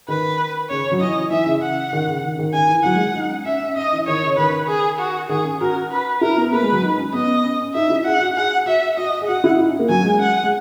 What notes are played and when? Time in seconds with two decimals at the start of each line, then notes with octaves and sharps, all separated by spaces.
0.08 D#3 B4
0.70 C#3 C#5
0.92 F#3
1.01 E3 D#5
1.30 E3 E5
1.46 C#3
1.62 F#5
1.93 D#3
2.08 C#3
2.23 D#3
2.39 D#3
2.54 D#3 G#5
2.69 E3
2.84 F#3 F#5
2.95 G#3
3.16 D#4
3.30 C#4
3.45 C#4 E5
3.60 C#4
3.76 C#4 D#5
3.92 E3
4.07 D#3 C#5
4.23 C#3
4.37 D#3 B4
4.68 G#4
4.99 F#4
5.29 D#3 G#4
5.44 C#4
5.61 F#4 A#4
5.91 B4
6.21 E4 A#4
6.37 B3
6.52 A#3 B4
6.62 G#3
6.72 F#3
6.83 D#4
6.98 C#4
7.14 B3 D#5
7.44 C#4
7.60 C#4
7.74 D#4 E5
7.90 E4
8.05 G#4 F#5
8.20 F#4
8.36 G#4 F#5
8.66 F#4 E5
8.97 F#4 D#5
9.21 G#4
9.28 F#4 F#5
9.44 E4
9.59 D#4
9.69 C#4
9.79 A#3
9.89 F#3 G#5
10.05 G#3
10.20 F#5
10.44 G#3